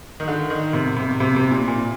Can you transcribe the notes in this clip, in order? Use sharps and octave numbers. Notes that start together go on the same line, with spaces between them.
D#3
D3
D#3
C3
C3
C3
C3
A#2
A#2